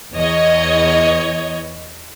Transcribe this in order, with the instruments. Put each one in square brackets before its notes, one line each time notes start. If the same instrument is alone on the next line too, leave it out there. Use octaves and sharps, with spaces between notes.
[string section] E2 E3 C#5 D#5 G#6